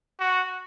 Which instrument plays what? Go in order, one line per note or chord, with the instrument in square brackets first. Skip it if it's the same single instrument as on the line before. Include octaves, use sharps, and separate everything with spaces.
[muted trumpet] F#4